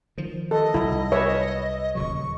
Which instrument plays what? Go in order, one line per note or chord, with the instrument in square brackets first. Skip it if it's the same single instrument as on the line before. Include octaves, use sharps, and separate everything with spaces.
[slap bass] D#3 F3
[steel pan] A4 [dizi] D#5
[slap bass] C2 F#3 G3 [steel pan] E4
[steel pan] B4 C#5 E5
[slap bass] D#1 C#3 F#3 [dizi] C#6